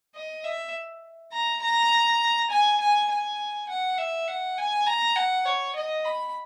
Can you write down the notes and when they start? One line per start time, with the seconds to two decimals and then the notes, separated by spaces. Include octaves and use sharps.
0.15 D#5
0.45 E5
1.33 A#5
1.62 A#5
2.51 G#5
2.80 G#5
3.10 G#5
3.69 F#5
3.98 E5
4.28 F#5
4.58 G#5
4.87 A#5
5.16 F#5
5.46 C#5
5.75 D#5
6.05 B5